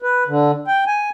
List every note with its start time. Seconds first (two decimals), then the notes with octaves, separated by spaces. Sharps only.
0.02 B4
0.28 D3
0.67 G5
0.87 G#5